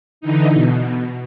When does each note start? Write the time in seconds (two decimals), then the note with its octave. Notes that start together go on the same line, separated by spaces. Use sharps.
0.21 D3 E3 D#4
0.52 B2